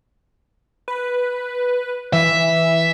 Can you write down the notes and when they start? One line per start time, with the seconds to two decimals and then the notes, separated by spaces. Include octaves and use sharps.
0.88 B4
2.13 E3 E5